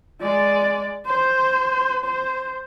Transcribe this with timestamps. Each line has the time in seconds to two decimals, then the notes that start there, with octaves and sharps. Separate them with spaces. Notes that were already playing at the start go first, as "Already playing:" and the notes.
0.20 G#3 D5
1.06 C5
2.04 C5